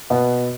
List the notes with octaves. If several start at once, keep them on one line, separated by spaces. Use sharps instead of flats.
B2 B3